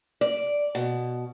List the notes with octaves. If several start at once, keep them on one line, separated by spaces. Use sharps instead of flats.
D5
B2